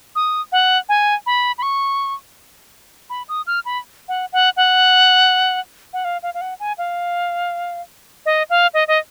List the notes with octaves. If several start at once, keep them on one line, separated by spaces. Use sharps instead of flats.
D#6
F#5
G#5
B5
B5
C#6
B5
D#6
F6
B5
F#5
F#5
F#5
F#5
F5
F5
F5
F#5
G#5
F5
D#5
F5
D#5
D#5